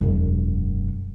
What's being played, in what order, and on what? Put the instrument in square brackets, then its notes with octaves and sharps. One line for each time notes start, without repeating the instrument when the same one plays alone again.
[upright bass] E1 F#2